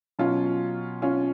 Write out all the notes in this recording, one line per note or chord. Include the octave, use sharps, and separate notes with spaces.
B2 F#3 C#4 F4
C#4 F4